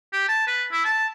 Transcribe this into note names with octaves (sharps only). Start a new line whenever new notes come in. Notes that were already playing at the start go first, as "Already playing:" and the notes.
G4
A5
B4
E4
A5